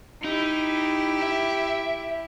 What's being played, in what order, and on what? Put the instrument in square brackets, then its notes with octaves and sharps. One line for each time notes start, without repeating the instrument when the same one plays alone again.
[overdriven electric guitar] D#4 [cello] E4 G4
[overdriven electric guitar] E5